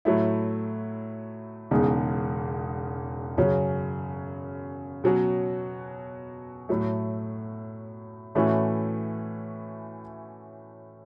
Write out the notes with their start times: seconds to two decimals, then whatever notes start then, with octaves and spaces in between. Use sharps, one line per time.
0.05 A2 F#3 A3 E4
1.71 E1 E2 C#3 G#3 D#4
3.37 F#2 C#3 F#3 C#4
5.04 B2 F#3 C#4 F#4
6.69 A2 F#3 A3
8.35 A2 E3 A3 C#4 F#4